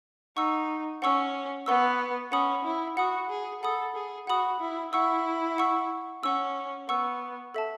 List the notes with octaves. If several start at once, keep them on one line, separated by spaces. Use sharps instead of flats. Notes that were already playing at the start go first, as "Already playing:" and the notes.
D#4 F#5 C#6 E6
C#4 F#5 C#6 E6
B3 F#5 C#6 E6
C#4 F#5 B5 D#6
E4
F#4 F#5 B5 D#6
G#4
A4 F#5 B5 D#6
G#4
F#4 F#5 B5 D#6
E4
E4 F#5 C#6 E6
F#5 C#6 E6
C#4 F#5 C#6 E6
B3 F#5 C#6 E6
A4 E5 A5